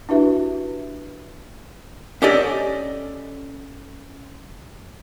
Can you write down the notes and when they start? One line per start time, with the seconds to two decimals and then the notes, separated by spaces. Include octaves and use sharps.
0.09 D4 E4 F#4 G4 B4 E5
2.22 C#4 G4 A4 D5 D#5